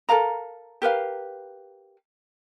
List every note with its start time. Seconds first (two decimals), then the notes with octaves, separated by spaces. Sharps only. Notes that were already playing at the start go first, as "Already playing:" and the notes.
0.09 A4 A#4 F5 A#5
0.82 G4 A#4 B4 F5